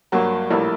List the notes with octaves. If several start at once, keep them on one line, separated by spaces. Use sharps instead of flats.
G2 F#3 A#3
A#1 A2 G3 A#3